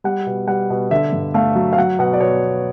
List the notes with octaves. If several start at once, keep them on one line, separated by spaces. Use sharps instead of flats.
G3 F#5
B2
G3 F#5
B2
D3 E5
G2
A3 F5
F#3
F5
F#3 F#5
B2 F#5
D5
B2 C#5